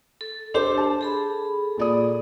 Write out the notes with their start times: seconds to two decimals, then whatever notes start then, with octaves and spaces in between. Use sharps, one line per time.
0.21 A4
0.54 D4 G4 A4 C5 D6
0.77 A5
1.01 G#4 A4 B5
1.77 A#2 D5 D#6